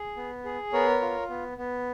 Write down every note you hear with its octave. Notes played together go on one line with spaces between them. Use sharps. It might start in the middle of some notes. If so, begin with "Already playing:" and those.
Already playing: G#4
B3
G#4
B3 A#4 C#5
F4
B3
B3